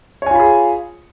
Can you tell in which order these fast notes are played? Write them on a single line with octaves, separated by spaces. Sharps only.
C#5 G#5 F4 B5 G#4